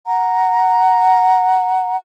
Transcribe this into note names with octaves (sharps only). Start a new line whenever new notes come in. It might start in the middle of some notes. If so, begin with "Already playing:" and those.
F#5 A#5